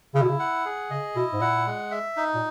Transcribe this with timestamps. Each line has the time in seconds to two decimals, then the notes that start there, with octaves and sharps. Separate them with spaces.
0.14 C#3 E4
0.22 B2
0.29 C#3
0.40 F#5
0.66 G#4
0.90 C#3 D#5
1.15 B2 E4
1.33 G#2
1.41 A#2 F#5
1.66 G#3
1.91 E5
2.17 D#4
2.34 A#2